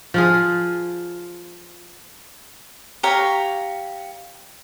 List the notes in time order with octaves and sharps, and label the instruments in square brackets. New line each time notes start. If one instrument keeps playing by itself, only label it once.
[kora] F3 F4 G#4
[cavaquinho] G4 C#5 F5 A#5